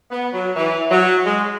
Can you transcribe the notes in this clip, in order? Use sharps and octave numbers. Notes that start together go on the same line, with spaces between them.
B3
F#3
E3
F#3
G#3